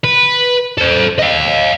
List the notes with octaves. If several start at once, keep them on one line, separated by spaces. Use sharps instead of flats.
B4
A4 C5
D#5 F5